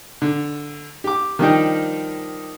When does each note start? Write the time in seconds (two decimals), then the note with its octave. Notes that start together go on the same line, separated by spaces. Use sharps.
0.22 D3
1.04 G4 D6
1.39 D#3 F3 G3 D4 D#4 G5